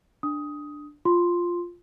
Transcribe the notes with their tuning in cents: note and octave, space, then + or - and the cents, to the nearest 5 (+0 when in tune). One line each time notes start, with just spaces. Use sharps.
D4 +5 D#6 +15
F4 +0 C6 +0